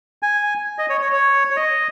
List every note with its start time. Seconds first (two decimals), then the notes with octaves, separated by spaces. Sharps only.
0.22 G#5
0.78 D#5
0.89 C#5
1.01 C#5
1.12 C#5
1.50 C#5
1.56 D#5